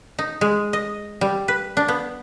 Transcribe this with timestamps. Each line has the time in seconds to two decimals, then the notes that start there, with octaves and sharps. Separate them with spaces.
0.19 D#4
0.41 G#3
0.73 D#5
1.21 G3
1.48 B4
1.77 D4
1.88 B3